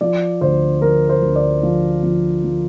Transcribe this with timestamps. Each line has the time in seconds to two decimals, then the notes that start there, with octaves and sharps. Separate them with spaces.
0.01 F3 D5
0.41 D2 C5
0.82 F3 A#4
1.09 C5
1.22 D2
1.36 D5
1.63 F3
2.03 F3
2.44 F3